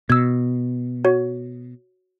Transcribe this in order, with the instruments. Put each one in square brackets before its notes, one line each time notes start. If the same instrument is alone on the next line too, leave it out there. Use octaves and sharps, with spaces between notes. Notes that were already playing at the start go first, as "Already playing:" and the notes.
[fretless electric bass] B2 [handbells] E6 G#6
[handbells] F#4 C#5